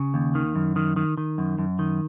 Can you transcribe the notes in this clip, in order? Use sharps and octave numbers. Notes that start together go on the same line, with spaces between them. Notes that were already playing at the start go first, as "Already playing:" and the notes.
Already playing: C#3
D#2
D#3
F#2
D#3
D#3
D#3
F#2
F#2
D#3